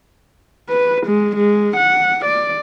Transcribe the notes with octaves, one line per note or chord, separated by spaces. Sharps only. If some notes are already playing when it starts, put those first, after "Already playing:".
B4
G#3
G#3
F#5
D5